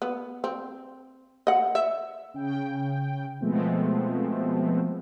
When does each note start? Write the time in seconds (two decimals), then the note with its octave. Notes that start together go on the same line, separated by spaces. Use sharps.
0.02 B3
0.44 C4
1.47 D#5 F#5
1.75 E5
2.34 C#3 G5
3.41 B2 F3 G#3 A3 B3 C4